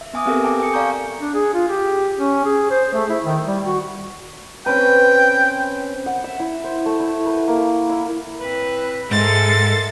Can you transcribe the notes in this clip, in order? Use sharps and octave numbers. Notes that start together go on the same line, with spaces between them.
E5
B3 E5 G#5 D6 D#6
B3 C4 G4 A4 A#4 E6
A4 G5 A5 D6
G#5 C#7
D5 F5 A#5 C#6 G6
D4
G#4
F4
G4
C#4
G#4
C5
A3
E4
D#3
G3
F#4
C4 C#4 B4 G5
F#5
E5
E4
C5
A3
E4
B4
A#3
E4
A2 C4 B4
G#2 G#3 A4 A#4 E5 C6 A6